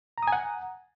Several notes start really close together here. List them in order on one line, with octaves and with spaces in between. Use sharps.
A#5 D#6 G#5 F#5